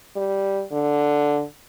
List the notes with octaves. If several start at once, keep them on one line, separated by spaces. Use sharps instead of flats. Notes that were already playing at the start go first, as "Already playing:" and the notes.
G3
D3